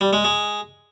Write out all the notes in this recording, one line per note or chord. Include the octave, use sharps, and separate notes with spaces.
G3
G#3
G#3